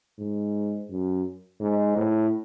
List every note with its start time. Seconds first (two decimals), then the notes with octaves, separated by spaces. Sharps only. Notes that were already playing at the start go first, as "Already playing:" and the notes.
0.19 G#2
0.90 F#2
1.61 G#2
1.96 A2